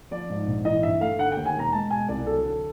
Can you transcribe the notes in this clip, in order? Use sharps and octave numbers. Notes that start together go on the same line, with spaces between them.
F3 D5
G#2
A#1
E3 D#5
G2 E5
A3 F5
D3 F#5
D#2 G5
G#5
E1 A#5
G#3 A5
B2 G#5
C2 D5
F#3 A4
D3